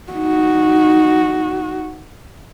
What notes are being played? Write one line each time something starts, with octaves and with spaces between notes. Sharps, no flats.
D#4 F#4